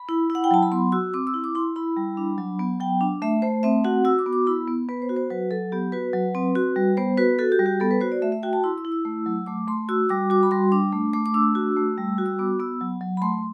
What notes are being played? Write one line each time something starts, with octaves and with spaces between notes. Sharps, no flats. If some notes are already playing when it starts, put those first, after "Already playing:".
Already playing: B5
E4
E4
F#5
G5
F#3 A5
B5
B3 C6
F#4 E6
C4 D6
E6
E4
D6
E4 C6
E4 B5
G3
D4
F#3
B3
F#3 G5
D4
A3 E5
A3 C5
C4 E5
F#4 F#5
F#4 E6
D6
B3
D6
E4 B5
B3
B3 B4
C5
F#4
C5
F#3 B4
F#3 A4
B3 G4
F#4 B4
F#3
C4
F#4
G3
B3 C5
F#4 B4
F#4 A4
G4
G3
G4
B3 A4
B4
F#4 C5
D5
A3 E5
E5
F#4 G5
A5
E4 C6
E6
E4
E6
A3
F#3
A3 D6
A3 C6
F#4 E6
G3 D6
F#4 D6
B5
G3 C6
D4 D6
A3
A3 D6
D6
D4 E6
F#4
A3
G3
F#4
E6
B3 D6
B3 E6
F#3
F#3
B5
A3 C6